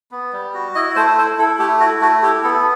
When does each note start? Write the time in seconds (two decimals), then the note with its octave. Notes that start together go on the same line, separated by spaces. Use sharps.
0.11 B3
0.33 G3
0.54 F#4
0.75 E4 D#5
0.96 A3 C5
1.18 E4 C5
1.38 E4 A4
1.59 A3 G4
1.80 E4 F#4
2.01 A3 F#4
2.23 E4 G4
2.44 B3 A4